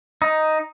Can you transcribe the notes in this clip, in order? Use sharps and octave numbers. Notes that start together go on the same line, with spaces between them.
D#4